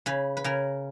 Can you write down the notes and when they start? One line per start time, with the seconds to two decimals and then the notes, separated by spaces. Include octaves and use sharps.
0.06 C#3 B4
0.37 B4
0.44 C#3 A#4